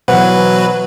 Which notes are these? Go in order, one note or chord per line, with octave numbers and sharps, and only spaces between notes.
B2 E3 F#3 B4 C5 F#5